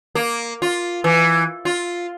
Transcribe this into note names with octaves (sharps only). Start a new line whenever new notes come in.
A#3
F4
E3
F4